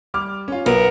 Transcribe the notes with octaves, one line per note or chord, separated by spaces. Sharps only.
G3 D6 F6
C#4 F4
B1 B3 A#4